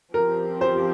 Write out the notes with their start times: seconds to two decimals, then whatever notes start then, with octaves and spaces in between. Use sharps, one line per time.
0.14 F3 C4 G4 A#4
0.61 C5